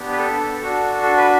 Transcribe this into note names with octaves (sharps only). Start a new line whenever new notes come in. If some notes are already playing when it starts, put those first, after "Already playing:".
Already playing: B3 D4 G4
B4
A4
D4 F#4 A4
A4
B4